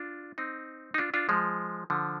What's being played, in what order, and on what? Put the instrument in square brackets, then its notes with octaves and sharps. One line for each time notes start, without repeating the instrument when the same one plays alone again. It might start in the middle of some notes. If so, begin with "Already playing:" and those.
Already playing: [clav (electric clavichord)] D4 F4
C4 D#4
D#4
D4 F4
D4 F4
F3 G#3
D3 F3